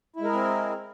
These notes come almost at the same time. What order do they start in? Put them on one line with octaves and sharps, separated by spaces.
E4 G#3 A#4 G#4 C4